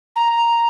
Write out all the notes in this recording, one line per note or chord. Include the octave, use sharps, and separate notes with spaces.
A#5